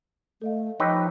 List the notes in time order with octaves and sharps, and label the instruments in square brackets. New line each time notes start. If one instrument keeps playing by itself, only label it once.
[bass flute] A3 [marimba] A4 D#5 F5
[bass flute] F3 [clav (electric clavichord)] D#4 G4 B4 [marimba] C#5 C#6 E6